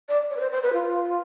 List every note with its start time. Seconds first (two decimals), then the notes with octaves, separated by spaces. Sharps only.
0.09 D5
0.30 C#5
0.36 B4
0.40 C5
0.51 C5
0.63 B4
0.73 F4